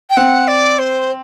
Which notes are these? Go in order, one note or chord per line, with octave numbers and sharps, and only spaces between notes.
G5
C4 F#5
D5
C5